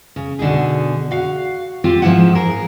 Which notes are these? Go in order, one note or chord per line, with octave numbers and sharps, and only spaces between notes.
C#3
B2 D3 D#4 G#4
F#4 F5
C4 F4 G4
G#2 F3 A3 C4 E4 F#5
G#4 A#4